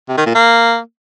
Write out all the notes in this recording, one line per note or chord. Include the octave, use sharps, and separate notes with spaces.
C3
D#3
A#2
A#3